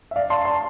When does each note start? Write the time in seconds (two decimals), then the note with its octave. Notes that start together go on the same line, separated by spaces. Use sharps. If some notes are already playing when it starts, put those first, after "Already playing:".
0.11 E5
0.16 D5 F5
0.30 A5 C6
0.45 A5 C6